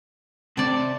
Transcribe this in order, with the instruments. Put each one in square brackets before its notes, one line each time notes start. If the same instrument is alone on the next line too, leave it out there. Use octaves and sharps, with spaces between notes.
[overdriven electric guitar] C3 [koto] D5 A5